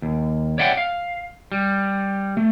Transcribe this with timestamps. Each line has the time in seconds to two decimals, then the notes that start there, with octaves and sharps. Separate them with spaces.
0.02 D#2
0.58 C#5 D5 E5 F#5 G5
0.77 F5
1.52 G3
2.37 A3